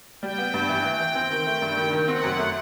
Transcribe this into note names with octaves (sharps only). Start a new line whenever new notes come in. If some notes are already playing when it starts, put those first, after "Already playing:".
G3 G5
B3
G2
E3
E3
E3
C4
D#3
A3
G2
D#3
D#3
C4 F#5
F#2
A3